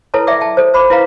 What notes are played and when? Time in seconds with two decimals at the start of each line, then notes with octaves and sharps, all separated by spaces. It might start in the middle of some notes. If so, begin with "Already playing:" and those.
0.14 E4 A4 B4 C#5 A5
0.27 D5 E5 F#5 G5 D6
0.41 G5 A5
0.57 A4 C5
0.74 C5 B5 D6
0.90 E4 B4 F5 A#5